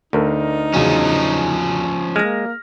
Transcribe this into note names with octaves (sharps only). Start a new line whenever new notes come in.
D2 D4 D#4 A4 A#4
E2 C#3 F3 F#3 C#4
G#3 A#3 F6 A#6